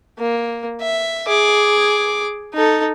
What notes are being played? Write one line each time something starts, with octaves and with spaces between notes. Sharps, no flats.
A#3
E5
G#4 D6
D#4 A4